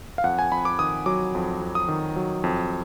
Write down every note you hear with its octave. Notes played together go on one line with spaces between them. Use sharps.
F5
F2 F#5
G#5
F2 B5
D6
D#3 D#6
F#3 D6
F2
F2
D#6
D#3
F#3
F2